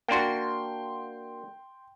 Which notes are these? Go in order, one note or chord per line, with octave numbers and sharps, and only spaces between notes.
A#3 D4 F#4 G5 C6